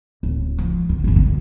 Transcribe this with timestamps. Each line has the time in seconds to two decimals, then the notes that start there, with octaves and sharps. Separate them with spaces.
0.23 D1
0.58 F3
0.89 D3
1.04 G1 D3
1.16 F#2